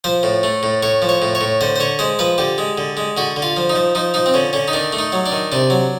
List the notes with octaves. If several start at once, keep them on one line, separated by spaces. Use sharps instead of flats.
F3 C5
A2
A3
A2
A2 C#5
F3
C#5
A2
C#5
A2
D3 C5
C5
D3 C#5
G#3 C5
F3 B4
D3 G4
G#3
D3
G#3
D3 F#4
D3
F4
F3
D#4
F3
F3 D#4
F3 D#4
C4
D3 C#4
D3 C#4
D#4
D#3 D4
A3
D#4
F#3
D4
D#3
C3 D4
F#3